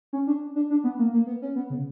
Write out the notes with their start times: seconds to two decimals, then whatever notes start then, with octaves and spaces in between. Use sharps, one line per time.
0.13 C#4
0.27 D4
0.56 D4
0.70 D4
0.84 B3
0.99 A#3
1.13 A#3
1.27 B3
1.42 C#4
1.56 B3
1.70 C#3